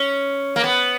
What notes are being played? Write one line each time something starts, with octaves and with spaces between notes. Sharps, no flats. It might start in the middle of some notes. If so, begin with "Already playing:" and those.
Already playing: C#4
A#3
B3